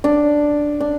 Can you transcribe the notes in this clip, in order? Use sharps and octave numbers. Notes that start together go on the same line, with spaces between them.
D4
D4